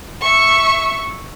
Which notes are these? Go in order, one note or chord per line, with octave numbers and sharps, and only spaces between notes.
E5 C#6